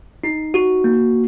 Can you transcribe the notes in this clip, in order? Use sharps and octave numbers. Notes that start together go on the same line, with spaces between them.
D#4
F#4
A#3